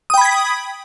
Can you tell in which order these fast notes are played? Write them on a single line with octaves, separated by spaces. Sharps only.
D#6 G5 B5 G#6 B6